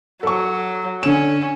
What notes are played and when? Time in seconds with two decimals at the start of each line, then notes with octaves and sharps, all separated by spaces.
0.23 F#3 A4 C#6
1.03 D3 C#4 E7